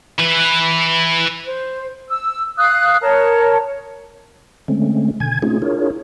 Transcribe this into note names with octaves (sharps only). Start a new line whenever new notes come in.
E3 B4
C5
E6
F5 D#6 F#6
A#4 C#5 A5
D3 G#3 A3 C4 C#4
B2 D3 G#5 G#6
A3 C4 C#4 D#4 F4 G#4
D4 E4 F4 G#4 A#4 C#5